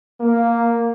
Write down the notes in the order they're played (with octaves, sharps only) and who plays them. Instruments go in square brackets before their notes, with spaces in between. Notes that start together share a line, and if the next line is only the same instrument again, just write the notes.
[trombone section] A#3